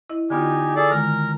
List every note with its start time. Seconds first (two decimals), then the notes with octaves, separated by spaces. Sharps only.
0.10 E4 D#5
0.30 D3 B3 D#4 F4 G4 G#5
0.76 G#4 A4 D5
0.91 D3 D#3 G#3 A#4 A#5